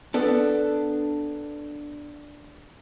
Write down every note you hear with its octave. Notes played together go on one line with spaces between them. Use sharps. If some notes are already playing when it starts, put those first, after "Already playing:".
B3 D4 A4